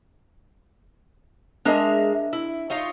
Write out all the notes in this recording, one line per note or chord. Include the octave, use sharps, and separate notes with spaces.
G#3 D4 A#4 D#5 E5
E4
D#4 F4 C#5